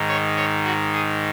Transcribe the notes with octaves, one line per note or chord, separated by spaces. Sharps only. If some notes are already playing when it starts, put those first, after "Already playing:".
Already playing: G#2 D#3
C#5
C#5
F#4
G#4